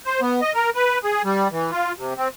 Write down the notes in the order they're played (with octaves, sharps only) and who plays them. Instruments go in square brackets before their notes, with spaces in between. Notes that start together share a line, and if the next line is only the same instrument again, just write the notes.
[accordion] C5
B3
D#5
A#4
B4
G#4
G3
E3
F4
C3
C4